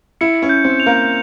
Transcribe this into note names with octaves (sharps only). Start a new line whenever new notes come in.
E4 C#7
C#4
G6
C4
F7
A#3